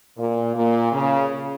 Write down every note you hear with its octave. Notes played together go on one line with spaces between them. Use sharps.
A#2
A#2
C#3